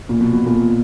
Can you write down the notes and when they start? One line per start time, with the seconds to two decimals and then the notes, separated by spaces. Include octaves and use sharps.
0.09 A#2
0.21 B2
0.33 B2
0.46 A#2